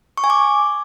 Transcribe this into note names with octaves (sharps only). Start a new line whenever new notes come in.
C#6
G#5
D6